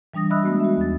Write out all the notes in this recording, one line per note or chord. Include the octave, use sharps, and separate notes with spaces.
E3 G3 D4 D#6 A#6
D#5 E5 B5 D#6 E6 F#6
G#3 A3 B3 D4 F#4
F#4 E5
D#2 A6